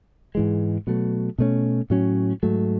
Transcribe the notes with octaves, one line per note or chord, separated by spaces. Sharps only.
G#2 E3 G#3
B2 F#3 A3
B2 A3 C#4
A2 F#3 C#4
G#2 F#3 A3